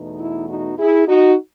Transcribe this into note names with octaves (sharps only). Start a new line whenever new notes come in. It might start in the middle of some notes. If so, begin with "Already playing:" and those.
Already playing: E2 B2 A3 D#4
E4
D#4 F#4
E4 G#4
D#4 F#4